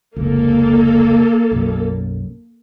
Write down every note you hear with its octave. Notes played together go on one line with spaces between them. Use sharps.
F1 C#2 A#3 A4
B1 F#2